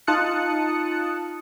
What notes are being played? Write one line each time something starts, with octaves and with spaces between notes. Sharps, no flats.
D#4 F4 A5 D#6 F#6 C#7